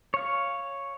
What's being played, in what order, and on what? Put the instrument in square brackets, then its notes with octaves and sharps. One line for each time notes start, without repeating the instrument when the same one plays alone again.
[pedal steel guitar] C#5 F5